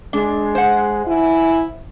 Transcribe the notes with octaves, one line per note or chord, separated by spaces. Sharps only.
G#3 D4
C5 F#5
E4 G#5